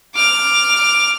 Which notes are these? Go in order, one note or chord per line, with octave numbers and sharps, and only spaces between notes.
D6 F6